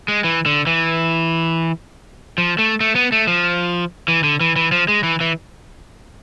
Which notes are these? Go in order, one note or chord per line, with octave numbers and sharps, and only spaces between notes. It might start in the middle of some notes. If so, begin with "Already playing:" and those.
G#3
E3
D3
E3
F3
A3
A3
B3
A3
F3
E3
D3
E3
E3
F3
G#3
E3
E3